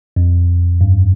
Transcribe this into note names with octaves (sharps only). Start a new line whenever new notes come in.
F2
G2